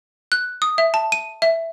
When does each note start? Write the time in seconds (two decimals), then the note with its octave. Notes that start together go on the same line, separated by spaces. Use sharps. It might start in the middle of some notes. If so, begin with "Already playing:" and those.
0.32 F#6
0.62 D#6
0.78 E5
0.94 A5
1.12 D#7
1.42 E5